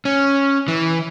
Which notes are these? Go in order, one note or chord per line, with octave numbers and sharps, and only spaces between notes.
C#4
E3